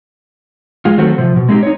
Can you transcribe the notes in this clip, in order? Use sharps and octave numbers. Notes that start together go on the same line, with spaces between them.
G#3 F4
D#3 F#3 A3 C4 F#4 A4
C3 F3
B2
G#3 A3 C4 D#4 G4
D#4 C#5